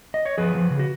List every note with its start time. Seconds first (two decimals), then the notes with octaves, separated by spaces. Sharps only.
0.14 D#5
0.25 C#5
0.38 F3 G#4 B4
0.55 F3
0.70 C#3
0.79 F#4